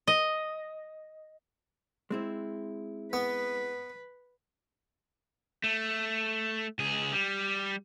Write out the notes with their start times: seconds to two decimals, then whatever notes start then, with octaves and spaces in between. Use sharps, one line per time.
0.07 D#5
2.10 G#3 C4 E4
3.13 B3 B4
5.64 A3
6.79 C#2 G#4
7.13 G3